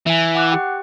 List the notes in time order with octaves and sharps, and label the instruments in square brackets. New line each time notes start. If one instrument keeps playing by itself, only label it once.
[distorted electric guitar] E3 [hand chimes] E5 G#5
[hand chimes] F#5 D6 F#6
G4 G5